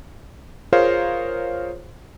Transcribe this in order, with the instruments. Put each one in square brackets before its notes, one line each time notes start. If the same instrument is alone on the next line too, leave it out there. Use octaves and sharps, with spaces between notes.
[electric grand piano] F4 G#4 A#4 C5 C#5 F5